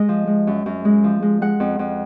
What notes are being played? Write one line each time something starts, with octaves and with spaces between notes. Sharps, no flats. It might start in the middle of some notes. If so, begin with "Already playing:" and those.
Already playing: G#3 D#5
F3
G#3
F#2
F#2
G#3
F3
G#3
G#3 F#5
F2
F2